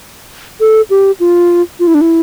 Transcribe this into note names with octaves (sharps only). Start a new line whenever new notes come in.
A4
G4
F4
F4
E4
D4
E4